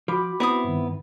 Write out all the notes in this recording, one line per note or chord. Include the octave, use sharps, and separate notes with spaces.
F3 F#4 B5 D6
B3 C4 E4 D#6
G2 D#3